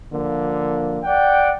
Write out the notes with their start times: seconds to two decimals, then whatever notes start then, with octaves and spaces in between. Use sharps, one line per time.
0.13 D3 F3 A#3
1.05 D5 F#5 G5